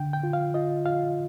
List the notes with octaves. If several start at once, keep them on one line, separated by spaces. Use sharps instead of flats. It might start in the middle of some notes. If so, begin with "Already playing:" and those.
Already playing: D3 G5
G5
F4
F5
F4 D#5
F4 F5